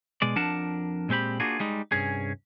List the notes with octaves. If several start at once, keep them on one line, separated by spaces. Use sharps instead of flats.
B2 G#3 D5
F2 F3 D4 A#4 F#5 A5
A#2 G#3 C4 G4 B5
A#3 D4 F4 F#4 G#4
G3 G#3 D#4
C2 G2 C#4 G#4